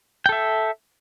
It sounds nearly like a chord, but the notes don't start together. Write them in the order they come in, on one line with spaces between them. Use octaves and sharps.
G5 A4 E5